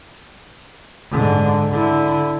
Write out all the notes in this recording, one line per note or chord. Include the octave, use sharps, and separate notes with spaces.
G#2 D3
D3 E4